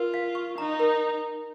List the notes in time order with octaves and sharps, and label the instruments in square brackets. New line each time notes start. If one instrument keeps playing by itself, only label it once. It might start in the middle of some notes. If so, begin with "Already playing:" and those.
Already playing: [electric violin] F4 [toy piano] A#4
[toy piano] F5
C#6
[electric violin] D#4 [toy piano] A#5
[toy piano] A#4